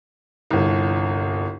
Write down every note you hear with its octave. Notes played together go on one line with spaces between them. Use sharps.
G1 C2